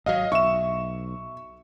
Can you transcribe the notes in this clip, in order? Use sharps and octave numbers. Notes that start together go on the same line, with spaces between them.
G#1 F#3 D#5 F5
B1 E5 C#6 E7